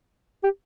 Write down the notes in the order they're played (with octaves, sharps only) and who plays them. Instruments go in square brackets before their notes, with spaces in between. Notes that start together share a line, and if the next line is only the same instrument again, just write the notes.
[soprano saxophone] G4